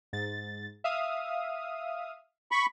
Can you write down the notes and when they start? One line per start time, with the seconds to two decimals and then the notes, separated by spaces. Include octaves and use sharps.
0.13 G#2 A6
0.84 E5 F5 D#6
2.52 B5 C#6